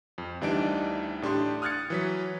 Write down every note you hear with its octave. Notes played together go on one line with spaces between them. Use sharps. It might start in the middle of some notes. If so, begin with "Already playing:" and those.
F2
D2 E3 G3 D4 D#4 D7
A2 D4 G4 C6
D#6 F6 F#6 G#6 A6 C#7
E3 F#3 B6